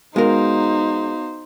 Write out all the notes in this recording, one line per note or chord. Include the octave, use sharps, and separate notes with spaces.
G#3 B3 D#4 F#4 A#4 C5 F5